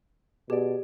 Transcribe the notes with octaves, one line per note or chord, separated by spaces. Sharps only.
B2 G4 G#4 D5